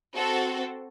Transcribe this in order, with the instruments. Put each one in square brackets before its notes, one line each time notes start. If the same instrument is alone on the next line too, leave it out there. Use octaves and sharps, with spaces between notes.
[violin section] C4 F#4 A4